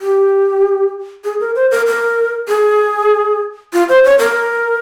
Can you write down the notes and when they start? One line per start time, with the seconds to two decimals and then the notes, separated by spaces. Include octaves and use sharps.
0.01 G4
1.24 G#4
1.40 A#4
1.56 C5
1.71 A#4
1.87 A#4
2.48 G#4
3.73 F4
3.89 C5
4.05 C#5
4.19 A#4